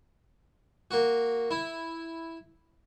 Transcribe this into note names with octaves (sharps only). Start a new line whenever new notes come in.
A#3 F#4
E4